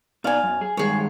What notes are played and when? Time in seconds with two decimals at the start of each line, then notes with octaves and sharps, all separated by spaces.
0.24 B2 D#4 D5 F5 G#5
0.44 F#2
0.61 G#4
0.77 G2 D#3 G#3 G#4 C#5